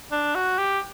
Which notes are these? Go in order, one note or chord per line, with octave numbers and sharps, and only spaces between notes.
D4
F#4
G4